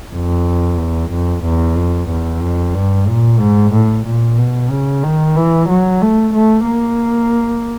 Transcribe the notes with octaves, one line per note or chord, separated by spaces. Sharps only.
F2
E2
F2
E2
F2
E2
F2
G2
A#2
G#2
A2
A#2
B2
C#3
D#3
E3
F#3
A3
A3
A#3